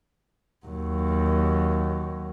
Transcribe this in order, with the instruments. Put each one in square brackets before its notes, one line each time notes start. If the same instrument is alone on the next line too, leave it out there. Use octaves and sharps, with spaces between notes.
[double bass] D#2 F#3